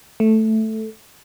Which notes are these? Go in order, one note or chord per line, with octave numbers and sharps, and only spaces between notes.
A3